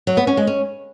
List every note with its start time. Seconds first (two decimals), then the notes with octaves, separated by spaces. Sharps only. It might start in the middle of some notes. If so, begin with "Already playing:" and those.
0.07 F#3
0.17 B3
0.27 C#4
0.37 G#3
0.47 C#4